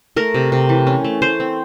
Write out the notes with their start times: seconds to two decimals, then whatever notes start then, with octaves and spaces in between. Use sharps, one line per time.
0.16 A3 A#4
0.34 C3
0.52 C3
0.69 E3
0.87 C#4
1.04 A3
1.22 A3 C5
1.40 C4